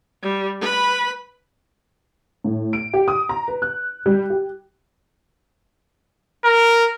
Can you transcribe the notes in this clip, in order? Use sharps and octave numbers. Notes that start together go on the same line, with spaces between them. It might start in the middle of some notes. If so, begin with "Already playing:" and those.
G3
B4 B5
A2
D7
G4
D#6
A#5
B4
F#6
G3
G4
A#4